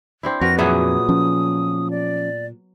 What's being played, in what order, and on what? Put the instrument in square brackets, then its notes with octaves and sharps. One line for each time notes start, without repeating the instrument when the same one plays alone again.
[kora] C4 D4 E4
[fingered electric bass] F2 [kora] F#4 A#4 B4 [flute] A#6
[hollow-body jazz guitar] A#2 G#4 E5 [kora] F#3 B3 [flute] D#6
[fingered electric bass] F3 C#4
[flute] D5